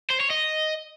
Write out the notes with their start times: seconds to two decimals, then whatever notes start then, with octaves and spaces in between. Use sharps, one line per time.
0.10 C5
0.20 C#5
0.30 D#5